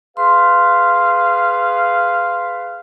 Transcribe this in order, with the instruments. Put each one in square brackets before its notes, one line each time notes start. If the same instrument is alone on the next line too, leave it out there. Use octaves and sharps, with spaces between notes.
[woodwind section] G#4 B4 F5 [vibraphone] C6